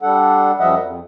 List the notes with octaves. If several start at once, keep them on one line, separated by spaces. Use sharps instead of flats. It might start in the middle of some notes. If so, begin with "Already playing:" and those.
G3 D4 A4 F#5
F#2 F3 G3 D#5 E5 F#5
F2